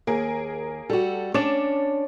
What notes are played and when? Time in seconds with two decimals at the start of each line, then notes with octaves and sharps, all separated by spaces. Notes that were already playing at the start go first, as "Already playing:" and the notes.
0.07 D#2 A#3 G#4 A#4
0.90 G3 F#4 A4
1.34 C#4 D4 C#5 D6 A6 E7